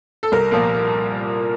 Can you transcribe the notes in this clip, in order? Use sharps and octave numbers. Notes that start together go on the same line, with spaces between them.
A4
C2 A#4
A#2 F3 A#3